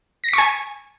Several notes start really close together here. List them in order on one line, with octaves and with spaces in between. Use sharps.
A#6 B6 C#6 G#5